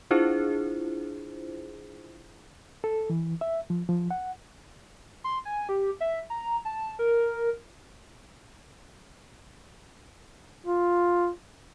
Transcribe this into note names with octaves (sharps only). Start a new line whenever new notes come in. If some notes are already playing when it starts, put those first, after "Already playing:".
D4 E4 F4 G#4 C5
A4
E3
E5
F3
F3
F#5
C6
G#5
G4
E5
A#5
A5
A#4
F4